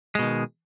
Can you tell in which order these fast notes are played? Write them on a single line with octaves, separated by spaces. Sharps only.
G#3 B2 D#3